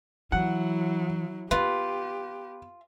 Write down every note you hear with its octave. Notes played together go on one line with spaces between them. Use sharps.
E3 F#3 E4 F#5
B3 F4 G4 B4